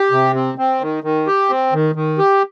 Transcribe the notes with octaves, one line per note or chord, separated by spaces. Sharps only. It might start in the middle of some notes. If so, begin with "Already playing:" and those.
Already playing: G4
C3
C4
C4
D#3
D#3
G4
C4
D#3
D#3
G4